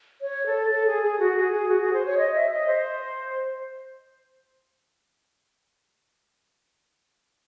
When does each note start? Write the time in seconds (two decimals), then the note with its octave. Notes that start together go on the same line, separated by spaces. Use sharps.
0.21 C#5
0.46 A4
0.71 A4
0.87 G#4
1.03 G#4
1.20 F#4
1.36 G#4
1.53 G#4
1.69 F#4
1.81 G#4
1.93 C5
2.06 C#5
2.18 D#5
2.35 E5
2.51 D#5
2.67 C5